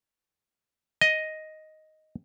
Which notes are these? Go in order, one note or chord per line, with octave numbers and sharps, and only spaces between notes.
D#5